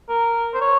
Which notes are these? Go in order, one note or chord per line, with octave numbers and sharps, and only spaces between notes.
A#4
C5
C#5